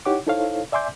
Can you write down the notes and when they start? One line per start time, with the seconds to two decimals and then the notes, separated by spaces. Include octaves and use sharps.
0.06 D#4 E4 G4 C#5 F#5 D6
0.27 D#4 E4 A4 C5 C#5 F5
0.72 D5 E5 G#5 C6 D6 G6